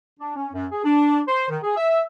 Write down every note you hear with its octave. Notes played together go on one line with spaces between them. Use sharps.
D4
C#4
F#2
G#4
D4
C5
D#3
G#4
E5